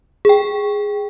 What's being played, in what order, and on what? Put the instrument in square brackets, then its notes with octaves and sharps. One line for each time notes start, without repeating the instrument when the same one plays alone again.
[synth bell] G#4 G5